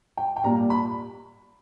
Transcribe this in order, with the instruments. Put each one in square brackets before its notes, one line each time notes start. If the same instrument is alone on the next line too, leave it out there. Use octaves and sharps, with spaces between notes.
[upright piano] G5
G5
A#2 G3 A#3 A#5
B5